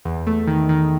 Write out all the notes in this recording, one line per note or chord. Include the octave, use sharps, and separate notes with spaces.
E2
A3
D#3
D#3